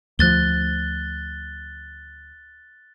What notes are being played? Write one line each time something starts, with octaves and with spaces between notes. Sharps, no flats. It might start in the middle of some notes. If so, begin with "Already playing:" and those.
D2 F3 F#6 A6 G7